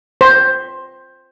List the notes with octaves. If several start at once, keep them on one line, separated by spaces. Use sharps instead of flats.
C5